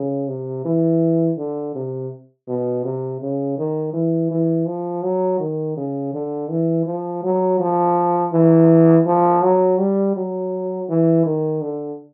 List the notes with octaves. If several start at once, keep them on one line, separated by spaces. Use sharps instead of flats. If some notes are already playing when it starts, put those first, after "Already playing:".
Already playing: C#3
C3
E3
D3
C3
B2
C3
C#3
D#3
E3
E3
F3
F#3
D#3
C#3
D3
E3
F3
F#3
F3
E3
F3
F#3
G3
F#3
E3
D#3
D3